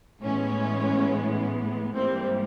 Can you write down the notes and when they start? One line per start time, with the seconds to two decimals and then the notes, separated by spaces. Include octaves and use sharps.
0.22 A2 E3 G#3 B3 C#4
1.95 G#2 E3 G3 A#3 C4